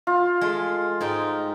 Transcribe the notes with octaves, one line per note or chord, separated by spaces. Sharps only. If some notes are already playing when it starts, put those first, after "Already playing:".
F4
G#3 A3
G#2 D#4 G5